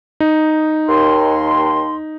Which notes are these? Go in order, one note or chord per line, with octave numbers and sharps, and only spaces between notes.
D#4
D#2 C6